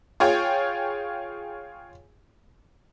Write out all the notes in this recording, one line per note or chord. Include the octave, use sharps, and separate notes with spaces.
F4 G#4 C#5 G5